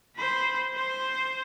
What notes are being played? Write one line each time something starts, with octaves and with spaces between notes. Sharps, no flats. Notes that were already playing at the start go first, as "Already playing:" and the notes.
C5 B5
C5